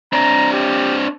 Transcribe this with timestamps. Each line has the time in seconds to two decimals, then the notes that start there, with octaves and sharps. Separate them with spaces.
0.13 C4 D4 A#5
0.52 G4